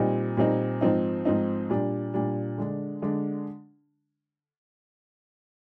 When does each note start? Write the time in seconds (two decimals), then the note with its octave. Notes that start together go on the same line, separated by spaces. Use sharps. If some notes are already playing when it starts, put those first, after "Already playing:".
Already playing: A#2 G3 C4 D#4
0.37 A#2 G3 C4 D#4
0.81 G#2 F3 C4 D#4
1.25 G#2 F3 C4 D#4
1.70 A#2 G3 D4
2.14 A#2 G3 D4
2.58 D3 G#3 D4
3.02 D3 G#3 D4